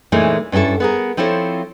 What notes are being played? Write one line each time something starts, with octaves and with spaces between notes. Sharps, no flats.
A#2 E3 G#3 A3 C#4 D#4
G2 C#4 D#4 E4 A4
B3 G#4 A#4
F3 C4 E4 A4 C#5